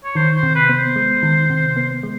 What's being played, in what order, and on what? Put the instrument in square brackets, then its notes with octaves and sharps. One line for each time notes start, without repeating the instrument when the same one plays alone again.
[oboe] C#5
[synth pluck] D#3 [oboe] C5
[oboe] C5
[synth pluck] C3
[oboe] B4
[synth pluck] B3
[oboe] C5
[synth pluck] G#3
D#3
C3
B3
G#3